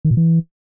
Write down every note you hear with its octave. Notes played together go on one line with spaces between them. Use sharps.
D#3
A#2
E3